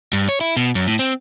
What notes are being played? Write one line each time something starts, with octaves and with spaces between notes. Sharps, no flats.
G2
C#5
E4
B2
F#2
A2
C4